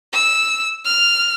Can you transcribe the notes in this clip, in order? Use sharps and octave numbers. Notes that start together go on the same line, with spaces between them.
E6
F6